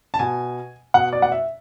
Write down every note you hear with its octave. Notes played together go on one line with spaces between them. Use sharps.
A5
B2 G#5
B2 F#5
D5
F#5
E5